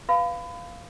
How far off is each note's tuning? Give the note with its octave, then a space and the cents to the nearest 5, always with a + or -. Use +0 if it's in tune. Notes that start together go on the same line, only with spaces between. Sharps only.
B4 +0 F5 +0 B5 +30